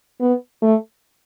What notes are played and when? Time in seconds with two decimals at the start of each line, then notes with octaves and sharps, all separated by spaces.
0.21 B3
0.62 A3